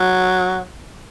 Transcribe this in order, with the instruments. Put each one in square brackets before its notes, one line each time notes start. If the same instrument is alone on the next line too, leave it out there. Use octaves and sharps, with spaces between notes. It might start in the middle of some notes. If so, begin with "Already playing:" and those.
Already playing: [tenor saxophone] F#3